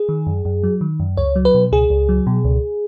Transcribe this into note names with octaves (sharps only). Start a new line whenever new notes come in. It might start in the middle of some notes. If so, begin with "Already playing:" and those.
Already playing: G#4
D#3
F#2
F#2
F#3
D#3
F#2
C#2 C#5
F#3
B4
B2
C#2 G#4
C#2
F#3
B2
C#2